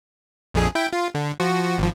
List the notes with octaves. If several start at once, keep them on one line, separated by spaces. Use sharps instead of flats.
A#1 F2 G#4
E4 G5
F4
D3
F3 F#4
G#1 F3